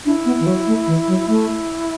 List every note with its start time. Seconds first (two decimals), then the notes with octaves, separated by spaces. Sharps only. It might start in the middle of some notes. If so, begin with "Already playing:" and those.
0.05 D4 E4
0.25 B3
0.40 E3
0.46 F#3
0.67 A3
0.87 E3
1.07 F#3
1.28 A3 E4